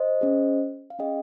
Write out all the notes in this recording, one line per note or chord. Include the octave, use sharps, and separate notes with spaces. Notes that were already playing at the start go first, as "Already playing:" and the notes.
Already playing: C5 D#5
C#4 G#4
F5
C#4 G#4 D#5 G5